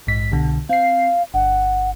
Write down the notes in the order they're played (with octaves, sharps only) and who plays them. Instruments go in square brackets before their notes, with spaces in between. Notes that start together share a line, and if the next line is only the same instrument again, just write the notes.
[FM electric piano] A#1 G#2 B6
C2 B2 D3
[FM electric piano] C4 C7 [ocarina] F5
[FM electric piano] G1 [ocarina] F#5